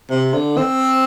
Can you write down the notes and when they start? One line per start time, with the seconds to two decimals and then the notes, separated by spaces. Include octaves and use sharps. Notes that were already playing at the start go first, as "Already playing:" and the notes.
0.10 C3
0.34 D3
0.57 C4